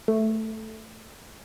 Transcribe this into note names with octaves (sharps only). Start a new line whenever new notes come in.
A3